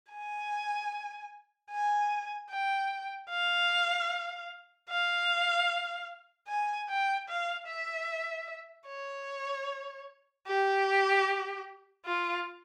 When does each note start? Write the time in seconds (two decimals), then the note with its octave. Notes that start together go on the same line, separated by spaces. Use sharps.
0.11 G#5
1.71 G#5
2.51 G5
3.30 F5
4.90 F5
6.48 G#5
6.89 G5
7.28 F5
7.68 E5
8.87 C#5
10.48 G4
12.06 F4